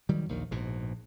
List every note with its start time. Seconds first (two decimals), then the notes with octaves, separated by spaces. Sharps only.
0.09 D#3 F#3 G3
0.29 A#1 D#2 D#3
0.51 A#1 G#2 B2